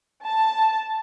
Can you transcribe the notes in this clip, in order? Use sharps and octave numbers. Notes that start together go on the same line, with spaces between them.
A5